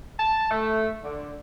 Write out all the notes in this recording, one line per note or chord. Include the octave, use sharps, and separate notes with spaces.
A5
A3
D3